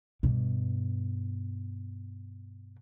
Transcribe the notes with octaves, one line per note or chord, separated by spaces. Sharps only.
G2 B2